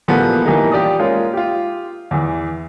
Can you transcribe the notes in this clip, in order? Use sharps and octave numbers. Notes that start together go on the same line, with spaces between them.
A#2 E3 F3 G3 A3 B3
E3 F3 G3 A#3 D#4
F4 G4 D5 D6 D#6
G#3 A#3 C#4 F4
F4 G4
E2 E3